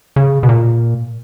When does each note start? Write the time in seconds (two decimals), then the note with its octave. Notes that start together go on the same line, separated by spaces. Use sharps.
0.16 C#3
0.43 B2
0.49 A#2